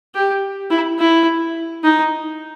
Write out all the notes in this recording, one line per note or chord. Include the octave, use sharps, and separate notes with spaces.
G4
E4
E4
D#4